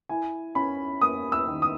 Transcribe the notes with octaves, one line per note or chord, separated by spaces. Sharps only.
E4 G#5
C#4 B5
A#3 D#6
E6
D#3
D#6